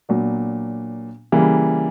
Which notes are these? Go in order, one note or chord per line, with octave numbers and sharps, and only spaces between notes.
A#2 F#3 B3 D4
C#3 E3 G3 A#3